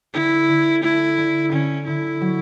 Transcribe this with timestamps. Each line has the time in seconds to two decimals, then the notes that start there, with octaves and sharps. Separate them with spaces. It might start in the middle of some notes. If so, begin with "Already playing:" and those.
0.14 D3 E4
0.49 D3
0.83 A3 E4
1.18 D3
1.52 D3 C#4
1.87 D3 E4
2.21 F#3